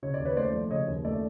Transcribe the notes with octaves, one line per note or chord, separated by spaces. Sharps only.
C#3 C#5
D5
D#2
B4 C#5
A3 C5 D5
F3
C#3 C#5 D#5
D#2
A3 D5 E5